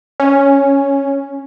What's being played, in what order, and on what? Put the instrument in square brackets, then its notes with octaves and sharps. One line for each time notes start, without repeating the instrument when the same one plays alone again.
[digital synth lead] C#4